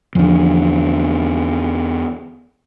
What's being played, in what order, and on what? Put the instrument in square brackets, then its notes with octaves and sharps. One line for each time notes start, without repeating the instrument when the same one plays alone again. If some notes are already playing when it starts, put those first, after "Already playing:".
[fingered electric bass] E2 D3 [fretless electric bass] F3